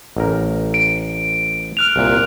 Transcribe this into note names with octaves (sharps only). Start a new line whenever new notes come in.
A1 A#4
D7
F6 F#6 F7
C2 A#2